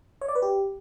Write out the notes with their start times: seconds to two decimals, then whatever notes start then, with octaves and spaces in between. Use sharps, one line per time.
0.21 C#5
0.28 D5
0.35 B4
0.42 G4